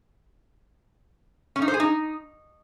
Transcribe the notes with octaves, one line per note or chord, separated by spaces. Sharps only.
C#4
D#4
C5
G#4
D#4